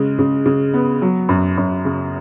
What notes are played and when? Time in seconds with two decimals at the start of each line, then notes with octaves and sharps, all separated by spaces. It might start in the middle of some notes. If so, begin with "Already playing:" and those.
Already playing: C#3 G#3
0.19 C#3
0.46 C#3
0.74 B3
1.02 F#3
1.29 F#2
1.57 F#2
1.85 C#3